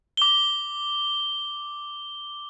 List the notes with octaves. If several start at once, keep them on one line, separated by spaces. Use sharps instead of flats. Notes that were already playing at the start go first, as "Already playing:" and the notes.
D6 G7